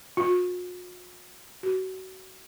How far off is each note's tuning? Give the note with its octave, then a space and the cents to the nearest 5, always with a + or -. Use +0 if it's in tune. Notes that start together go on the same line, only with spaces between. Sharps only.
F#4 -45
F#4 +25